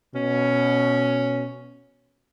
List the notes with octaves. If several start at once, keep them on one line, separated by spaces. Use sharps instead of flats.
B2 C#4